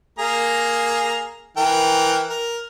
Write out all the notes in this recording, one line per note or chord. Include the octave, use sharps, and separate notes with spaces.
A#3 G#4 A#5
E3 A#4 G5
A#4